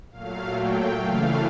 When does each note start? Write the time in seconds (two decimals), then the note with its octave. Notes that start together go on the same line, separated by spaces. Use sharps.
0.11 A#2 F#3 A3 F5
0.55 G5
0.98 F#2 C#3 E3 A3 F5